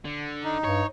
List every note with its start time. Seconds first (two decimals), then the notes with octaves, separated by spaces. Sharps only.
0.05 D3
0.44 D#4
0.64 G2 C#5